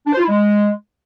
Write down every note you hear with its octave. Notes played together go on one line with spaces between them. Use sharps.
D4
C5
F4
E4
G#3